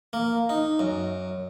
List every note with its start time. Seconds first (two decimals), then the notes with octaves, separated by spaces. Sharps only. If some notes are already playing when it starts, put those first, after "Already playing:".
0.13 A#3
0.49 D#4
0.79 F#2